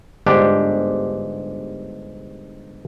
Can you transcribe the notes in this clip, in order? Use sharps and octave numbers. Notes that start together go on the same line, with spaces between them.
G1 G#2 D4 G4